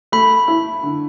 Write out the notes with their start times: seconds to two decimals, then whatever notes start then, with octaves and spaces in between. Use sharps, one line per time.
0.12 A3 B5
0.48 E4
0.83 D3